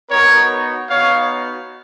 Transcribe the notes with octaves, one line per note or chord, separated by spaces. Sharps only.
B3 D#4 F#4 A#4 C#5
B3 D#4 F#4 C#5 F5